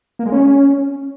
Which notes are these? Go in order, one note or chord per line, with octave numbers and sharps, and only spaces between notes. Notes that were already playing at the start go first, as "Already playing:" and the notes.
A#3
G#3
C#4